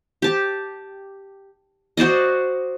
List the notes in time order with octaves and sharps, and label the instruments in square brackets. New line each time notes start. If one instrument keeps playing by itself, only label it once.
[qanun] G4 A5
F#4 C5 D5 D#5